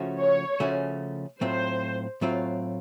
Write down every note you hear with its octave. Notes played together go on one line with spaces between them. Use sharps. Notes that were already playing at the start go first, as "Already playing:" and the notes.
Already playing: C#3 F3 A3 C#4 F#4
C#5
C#3 F3 A3 C#4 F#4
A2 F#3 A3 C4 F4 C5
A2 F#3 A3 C4 F4